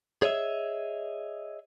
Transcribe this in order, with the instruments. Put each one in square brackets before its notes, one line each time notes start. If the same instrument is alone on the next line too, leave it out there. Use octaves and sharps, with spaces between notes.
[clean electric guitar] G#4 C#5 D#5 E5